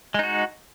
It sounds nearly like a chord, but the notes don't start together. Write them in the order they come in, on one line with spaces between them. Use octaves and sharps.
G#3 D#4 F#4